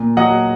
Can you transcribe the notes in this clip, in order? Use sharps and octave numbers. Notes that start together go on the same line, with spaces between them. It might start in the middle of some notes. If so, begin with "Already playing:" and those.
Already playing: A#2
F#3 D#5 F#5